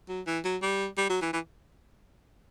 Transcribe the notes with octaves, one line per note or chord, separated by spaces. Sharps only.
F#3
E3
F#3
G3
G3
F#3
E3
E3